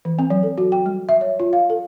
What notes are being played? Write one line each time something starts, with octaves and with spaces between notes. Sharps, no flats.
E3
C4
F#3
A4
F#4
G5
G3
E5
C#5
F4
F5
A4